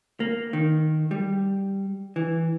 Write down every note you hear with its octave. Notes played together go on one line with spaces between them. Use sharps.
A#3
D#3
G3
E3